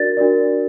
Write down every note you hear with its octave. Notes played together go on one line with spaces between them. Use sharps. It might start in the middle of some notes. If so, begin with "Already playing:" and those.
Already playing: D4 F#4 A#4 D5 A6
D4 F#4 A#4 D5